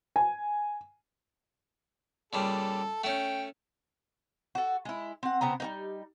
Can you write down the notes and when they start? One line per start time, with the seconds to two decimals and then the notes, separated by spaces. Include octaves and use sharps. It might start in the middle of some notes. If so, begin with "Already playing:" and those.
0.16 G#5
2.33 A#2 C#3 G3 A4
3.04 A3 C#4 G5
4.55 F#4 A4
4.85 G#3 E4
5.23 C4 F#5
5.41 C#3 B3 C4 A#5
5.60 G3 A#3 D#4